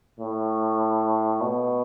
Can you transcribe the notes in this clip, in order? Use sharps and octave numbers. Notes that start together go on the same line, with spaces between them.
A2
B2